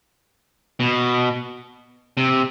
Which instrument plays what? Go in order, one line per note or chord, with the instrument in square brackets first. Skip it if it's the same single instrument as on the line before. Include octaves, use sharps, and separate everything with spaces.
[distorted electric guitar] B2
C3